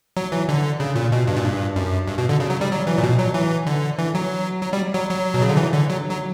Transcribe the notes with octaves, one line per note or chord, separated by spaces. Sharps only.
F#3
E3
D3
C#3
A#2
B2
G2
A#2
G2
F#2
G2
B2
D3
C#3
F#3
G3
F#3
E3
A#2
B2
F#3
E3
D3
E3
F#3
F#3
G3
F#3
F#3
B2
C#3
D3
E3
D3
F#3
F#3